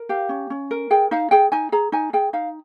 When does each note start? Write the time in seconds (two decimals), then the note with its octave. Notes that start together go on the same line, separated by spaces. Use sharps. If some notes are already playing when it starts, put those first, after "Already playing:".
Already playing: A#4
0.09 G4 F5
0.29 C#4
0.50 C#4
0.71 A#4
0.90 G#4 G5
1.11 D#4 F5
1.31 G#4 G5
1.52 D#4 G#5
1.72 G#4 A#5
1.92 D#4 G#5
2.13 G#4 G5
2.33 D#4 F5